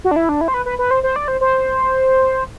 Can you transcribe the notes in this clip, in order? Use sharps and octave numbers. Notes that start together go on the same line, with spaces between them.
F#4
D4
E4
D4
E4
C5
B4
B4
B4
C5
C5
D5
C5
C5